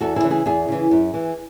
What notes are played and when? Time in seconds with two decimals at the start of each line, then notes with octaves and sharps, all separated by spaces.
0.01 E2 F#4 A4
0.16 E4 G#4
0.23 C#3 E3
0.30 E4 G#4
0.46 E2 E4 G#4
0.68 C#3 E3
0.91 F#2
1.14 E3